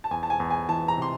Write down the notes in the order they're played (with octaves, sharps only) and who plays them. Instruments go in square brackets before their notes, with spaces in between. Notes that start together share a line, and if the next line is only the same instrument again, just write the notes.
[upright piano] A5
[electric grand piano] E2 [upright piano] G#5
[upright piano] A5
G#5
[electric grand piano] E2
[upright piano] G#5
[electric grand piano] E3 [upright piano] A5
[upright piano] A#5
[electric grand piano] C3 [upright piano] C6